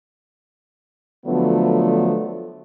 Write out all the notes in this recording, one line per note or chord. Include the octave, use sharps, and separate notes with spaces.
D3 F3 F#3 A3 B3 D4